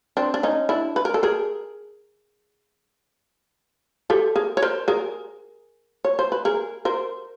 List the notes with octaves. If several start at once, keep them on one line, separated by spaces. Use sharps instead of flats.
C4 D4
D4
C#4 D#4
D4 E4
B4
A#4
A4
G#4 A#4
G4 A4
G#4 A#4
C#5
A#4 C5
G#4 A#4
C#5
C5
B4
G#4 A#4
A#4 C5